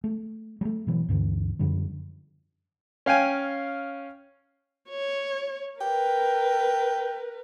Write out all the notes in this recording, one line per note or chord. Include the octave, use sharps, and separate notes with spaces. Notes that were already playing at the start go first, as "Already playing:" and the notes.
A3
G3 A3
B2 E3 F#3
D2 G2 D3 E3
F#2 D3 F3 G3
C#4 F5 G5 G#5
C#5
A#4 B4 G5